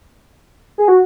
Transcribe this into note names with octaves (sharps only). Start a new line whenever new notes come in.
G#4
F#4